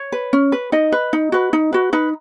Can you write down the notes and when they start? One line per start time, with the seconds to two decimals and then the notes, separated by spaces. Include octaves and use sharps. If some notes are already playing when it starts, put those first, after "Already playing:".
Already playing: C#5
0.12 B4
0.33 C#4
0.52 B4
0.72 D#4 D#5
0.92 B4
1.13 D#4
1.32 F#4 B4
1.53 D#4
1.73 F#4 B4
1.93 D#4 B4